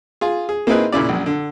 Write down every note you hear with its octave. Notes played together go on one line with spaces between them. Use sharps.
F4 G#4
G#4
A#3 C4 D#4 E4 G#4 B4
A#2 C#3 E4 D5
A#1 F#2
D3